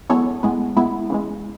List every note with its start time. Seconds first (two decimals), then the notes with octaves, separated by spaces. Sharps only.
0.10 F#2 E3 G#3 B3 A4 C#5
0.43 A2 G#3 B3
0.77 A2 G#3 B3 E4
1.10 C#3 E3 G#3